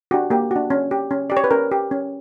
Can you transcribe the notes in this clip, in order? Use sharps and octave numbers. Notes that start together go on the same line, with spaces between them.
D4 F#4 G4
A#3 G4
D4 F#4
C#4
G4
C#4
G4 D5
C#5
B4
C#4 A#4
G4
C#4